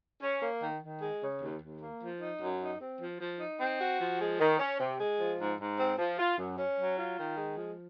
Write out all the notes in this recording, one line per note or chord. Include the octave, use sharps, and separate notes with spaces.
C#4
A#3
D#3
D#3
G#3
C#3
D#2
D#2
A#3
F3
D#4
F#2
D#4
C4
F3
F3
D#4
C4
F#4
F3
G#3
D#3
C#4
C3
G#3
F3
G#2
G#2
C4
F3
F4
F#2
C#4
F#3
F4
D#3
G#3
F3